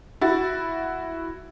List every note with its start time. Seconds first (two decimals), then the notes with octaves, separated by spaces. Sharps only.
0.21 E4 F#4 A6